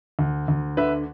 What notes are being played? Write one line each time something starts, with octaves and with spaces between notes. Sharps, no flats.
D2
D2
D3 B4 E5